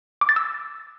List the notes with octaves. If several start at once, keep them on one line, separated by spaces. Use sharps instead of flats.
D6
A6
E6